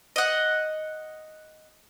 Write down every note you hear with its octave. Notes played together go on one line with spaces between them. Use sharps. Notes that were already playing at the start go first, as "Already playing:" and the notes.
D#5 F#5